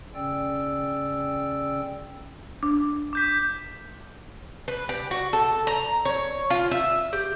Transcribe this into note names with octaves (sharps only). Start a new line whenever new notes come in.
C#3 C#4 D5 G5 E6
D4
D6 G6 B6
B4
G4
F#4
A4
A#5
C#5
F4
E5
G4